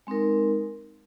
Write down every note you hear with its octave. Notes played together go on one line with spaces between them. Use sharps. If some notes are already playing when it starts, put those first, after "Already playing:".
G#3 C4 D#4 A#4